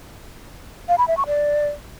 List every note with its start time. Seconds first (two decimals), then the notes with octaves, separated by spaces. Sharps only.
0.89 F5
0.98 B5
1.08 E5
1.17 C#6
1.27 D5